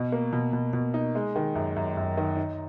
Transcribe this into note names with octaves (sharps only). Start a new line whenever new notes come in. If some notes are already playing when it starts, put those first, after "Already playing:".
Already playing: B2
A#3
B2
B2
B2
D#4
G#3
D#3
F#2
F#2
F#2
D#3
D#4